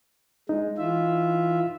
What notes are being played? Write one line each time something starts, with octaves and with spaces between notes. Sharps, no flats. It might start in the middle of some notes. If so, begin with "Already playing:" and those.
G#3 D#4
E3 F4 E5